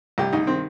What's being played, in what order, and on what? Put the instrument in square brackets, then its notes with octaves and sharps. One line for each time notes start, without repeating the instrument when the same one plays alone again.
[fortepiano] C2 G4
C2 D#4
D#3 C4